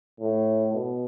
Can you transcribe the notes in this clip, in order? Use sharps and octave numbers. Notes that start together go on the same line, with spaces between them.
A2
B2